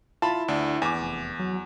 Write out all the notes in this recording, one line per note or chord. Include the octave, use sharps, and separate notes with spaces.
E4 F4 A5 B5
D2 D4
E2 G#5 D6
F1
F#3